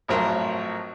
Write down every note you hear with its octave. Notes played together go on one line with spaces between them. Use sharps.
G#1 A2 F3 F#3 A#4 C6